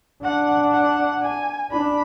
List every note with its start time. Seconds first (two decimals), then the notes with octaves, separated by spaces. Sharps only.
0.24 D4 F#5
0.73 F#5
1.22 G#5
1.71 D4 B5